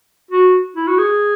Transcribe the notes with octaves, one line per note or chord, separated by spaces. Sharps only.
F#4
E4
F#4
G#4